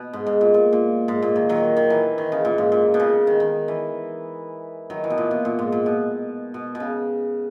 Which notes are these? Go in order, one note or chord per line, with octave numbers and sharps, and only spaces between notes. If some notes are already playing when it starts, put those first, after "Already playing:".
Already playing: B2
G#2
G#2
A#2
A#2
A#2
G#2
A#2
D#3
D#3 F#3
D#3
E3
D#3
C#3
A#2
G#2
A#2
B2
C#3
D#3
D#3
E3
D#3 F#3
E3
B2
A#2
B2
A#2
G#2
A#2
B2
B2
B2
C#3